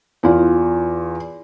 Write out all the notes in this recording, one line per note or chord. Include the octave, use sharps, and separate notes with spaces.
E2 F4